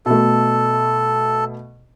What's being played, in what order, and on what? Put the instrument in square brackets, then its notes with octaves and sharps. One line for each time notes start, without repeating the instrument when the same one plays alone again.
[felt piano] B2 A3 [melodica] A4